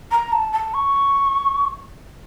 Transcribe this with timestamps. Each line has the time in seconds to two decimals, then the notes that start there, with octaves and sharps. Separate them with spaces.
0.11 A#5
0.32 A5
0.53 A5
0.74 C#6